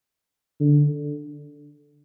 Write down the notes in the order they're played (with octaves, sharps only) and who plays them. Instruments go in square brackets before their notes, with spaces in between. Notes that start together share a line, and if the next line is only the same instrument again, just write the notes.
[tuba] D3